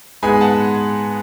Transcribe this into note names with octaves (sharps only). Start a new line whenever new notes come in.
G#2 G#3 B3 G#5 B5
F#5 A5